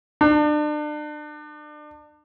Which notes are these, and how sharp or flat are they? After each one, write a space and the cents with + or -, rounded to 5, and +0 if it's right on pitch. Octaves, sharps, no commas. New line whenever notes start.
D4 +35